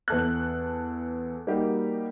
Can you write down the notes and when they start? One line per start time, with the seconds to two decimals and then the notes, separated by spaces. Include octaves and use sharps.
0.08 E2 A4 F#6
1.47 G3 A#3 D#4 F#4 G4